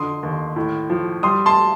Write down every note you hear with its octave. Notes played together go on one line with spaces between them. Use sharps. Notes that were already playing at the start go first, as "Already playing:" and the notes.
Already playing: F2 D3 C6 D#6
D#2
A2
F3
G3 C6 D#6
A5 C6